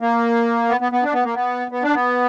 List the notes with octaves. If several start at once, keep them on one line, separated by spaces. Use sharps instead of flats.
A#3
B3
B3
B3
D4
B3
A#3
B3
B3
D4
B3